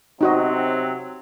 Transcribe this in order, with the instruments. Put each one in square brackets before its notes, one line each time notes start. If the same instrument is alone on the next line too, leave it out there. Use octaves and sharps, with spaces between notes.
[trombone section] C3 F#3 C4 [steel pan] D#4 F#4 D#5